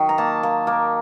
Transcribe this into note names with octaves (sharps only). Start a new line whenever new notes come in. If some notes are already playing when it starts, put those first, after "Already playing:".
Already playing: D#3 F#3
A#5
A#3 A5
A#3
A#3